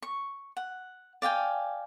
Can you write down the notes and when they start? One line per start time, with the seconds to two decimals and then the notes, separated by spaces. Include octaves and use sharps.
0.02 C#6
0.57 F#5
1.22 D5 F5 G5 G#5